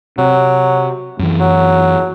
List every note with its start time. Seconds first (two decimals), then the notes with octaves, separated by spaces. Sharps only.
0.18 C3 F#3
1.19 F#2 E3
1.40 F#3